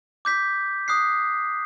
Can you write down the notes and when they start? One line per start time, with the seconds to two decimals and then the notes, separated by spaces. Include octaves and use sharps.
0.25 D6 G6 B6
0.88 D#6 F#6 C7